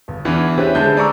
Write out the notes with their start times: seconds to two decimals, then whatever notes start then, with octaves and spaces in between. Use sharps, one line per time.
0.08 G1
0.25 E2 E3 D4
0.58 C#4 D4 E4 G4 B4 C5
0.75 D3 G#3 A5 G6
0.97 D5 A#5 C#6 E6